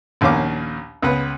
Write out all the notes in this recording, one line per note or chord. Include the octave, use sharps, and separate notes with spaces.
A#1 D#2 B3 C#4 F5 D6
C#2 B3 B4